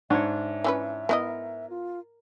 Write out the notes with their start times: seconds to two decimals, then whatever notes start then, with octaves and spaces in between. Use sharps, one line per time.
0.10 G#2 D4 C#5 E5
0.64 E3 C#4 B4
1.09 B3 E4 A#4 D#5
1.70 F4